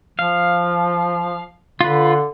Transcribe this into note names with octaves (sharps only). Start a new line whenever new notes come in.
F3 F5
D3 F4 B4